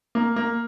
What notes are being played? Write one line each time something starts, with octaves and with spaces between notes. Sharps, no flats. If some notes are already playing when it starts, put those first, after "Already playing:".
A#3
A#3